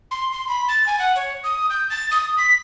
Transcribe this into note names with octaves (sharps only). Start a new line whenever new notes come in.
C6
C6
B5
A6
G#5
F#5
C#5
D#6
G6
A6
D#6
B6